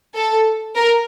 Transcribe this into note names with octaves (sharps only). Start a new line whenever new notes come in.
A4
A#4